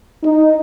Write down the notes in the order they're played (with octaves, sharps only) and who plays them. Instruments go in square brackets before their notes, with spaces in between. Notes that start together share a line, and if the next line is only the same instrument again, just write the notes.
[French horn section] D#4